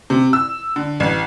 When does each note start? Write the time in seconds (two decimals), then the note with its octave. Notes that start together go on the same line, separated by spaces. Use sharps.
0.10 C3
0.33 E6
0.76 D3
1.00 A1